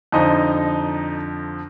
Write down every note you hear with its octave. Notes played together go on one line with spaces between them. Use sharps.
F2 D3 F3 D#4 D#5